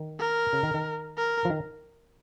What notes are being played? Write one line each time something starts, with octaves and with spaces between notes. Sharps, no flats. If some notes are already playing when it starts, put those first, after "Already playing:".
Already playing: D#3
A#4
C#3
D#3
D#3
A#4
F3
D#3